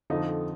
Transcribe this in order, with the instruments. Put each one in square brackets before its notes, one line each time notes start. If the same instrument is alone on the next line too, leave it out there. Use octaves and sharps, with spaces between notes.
[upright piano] F2 D3 F3 D#4